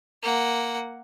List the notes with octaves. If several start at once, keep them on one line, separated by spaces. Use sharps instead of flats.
A#3 F#5